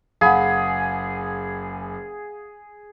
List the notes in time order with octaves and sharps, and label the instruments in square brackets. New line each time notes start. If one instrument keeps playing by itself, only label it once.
[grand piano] F#1 B5 [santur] G#4 [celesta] F5 F#5